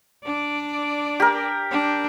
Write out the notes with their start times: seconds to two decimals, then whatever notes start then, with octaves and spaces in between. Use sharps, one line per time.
0.24 D4 D5
1.20 G4 A#4
1.71 D4